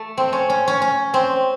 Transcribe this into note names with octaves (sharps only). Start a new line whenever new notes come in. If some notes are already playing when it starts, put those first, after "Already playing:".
Already playing: A3
C4
C#4
C#4
C#4
C#4
C4